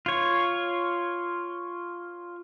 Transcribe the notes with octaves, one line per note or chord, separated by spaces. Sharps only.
F4 C#5